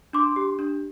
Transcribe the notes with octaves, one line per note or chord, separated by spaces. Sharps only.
D4 C6 D6
G4
D4